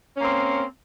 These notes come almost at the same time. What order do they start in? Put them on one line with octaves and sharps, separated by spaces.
C#4 A#3 C4